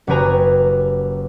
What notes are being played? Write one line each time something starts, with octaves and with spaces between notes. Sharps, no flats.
F#1 F#3 G4 B4 G#5 A#5